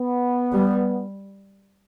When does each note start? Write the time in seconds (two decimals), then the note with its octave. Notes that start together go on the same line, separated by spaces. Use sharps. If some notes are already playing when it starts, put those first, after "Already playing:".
Already playing: B3
0.53 G3